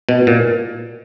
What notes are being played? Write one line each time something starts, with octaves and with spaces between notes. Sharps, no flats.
B2
A#2